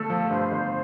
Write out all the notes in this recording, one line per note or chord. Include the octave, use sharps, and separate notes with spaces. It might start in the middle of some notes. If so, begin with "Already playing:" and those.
Already playing: G1 A3 A4
F3
G2 C5
G1